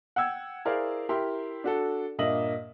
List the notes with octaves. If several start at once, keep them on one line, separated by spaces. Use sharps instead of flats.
F#5 G5 E6 G#6
E4 G#4 A#4 C5 D5 F5
E4 G4 A#4 C6
D4 F#4 A4
G2 A#2 A#3 D#5 E5 F#7